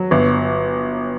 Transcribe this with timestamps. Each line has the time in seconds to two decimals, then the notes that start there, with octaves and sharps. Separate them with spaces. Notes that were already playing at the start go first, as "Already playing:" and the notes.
Already playing: F#3
0.11 G1